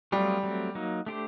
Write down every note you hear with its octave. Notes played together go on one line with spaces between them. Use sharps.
F#3 G3 A3 C4 F4 G#4
F#3 A3 C4
F#3 A#3 D#4
A3 D4 G4 C5